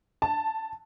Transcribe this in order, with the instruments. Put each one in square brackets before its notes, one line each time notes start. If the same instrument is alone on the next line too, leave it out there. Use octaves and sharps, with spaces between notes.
[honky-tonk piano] A5